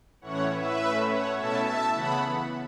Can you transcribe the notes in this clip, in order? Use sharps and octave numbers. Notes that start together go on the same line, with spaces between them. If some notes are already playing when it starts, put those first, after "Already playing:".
A2 E3 C#4 E4 C#5 F#5
B4 E5
A2 A3 C#4
C#5 F#5
B2 A3 C#4 E4 E5 A5
E5 A5
C#3 E3 B3 F#5 B5